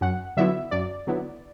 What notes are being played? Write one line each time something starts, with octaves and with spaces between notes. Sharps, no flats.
F#2 F#5
D3 F#3 B3 E4 E5
F#2 D5
D3 F#3 B3 E4